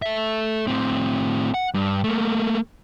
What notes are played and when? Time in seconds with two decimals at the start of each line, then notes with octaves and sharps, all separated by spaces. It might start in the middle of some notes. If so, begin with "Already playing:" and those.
0.02 A4 E5
0.67 A2 C4
1.54 F#5
1.74 G2
2.04 A3 A#3